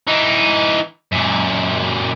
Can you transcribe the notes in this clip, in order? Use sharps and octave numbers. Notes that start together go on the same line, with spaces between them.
E3 D#4
F#2 A#2